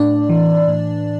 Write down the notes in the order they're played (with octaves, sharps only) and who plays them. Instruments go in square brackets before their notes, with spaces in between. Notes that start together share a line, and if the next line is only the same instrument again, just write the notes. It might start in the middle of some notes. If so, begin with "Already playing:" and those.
Already playing: [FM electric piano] A2 D4 D5
E3
A2